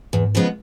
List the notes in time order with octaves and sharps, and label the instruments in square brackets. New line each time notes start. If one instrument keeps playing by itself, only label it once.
[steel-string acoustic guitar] E2 [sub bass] G#2
[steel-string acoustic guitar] C#3 F3 G#3 B3